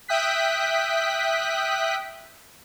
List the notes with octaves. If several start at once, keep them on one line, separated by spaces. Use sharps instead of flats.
E5 G5 D#6 F#6 B6